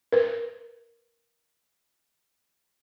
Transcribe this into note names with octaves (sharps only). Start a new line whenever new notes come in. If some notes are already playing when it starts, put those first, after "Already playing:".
A#4 B4